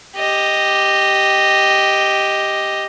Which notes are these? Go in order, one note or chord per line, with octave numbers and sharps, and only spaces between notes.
G4 D#5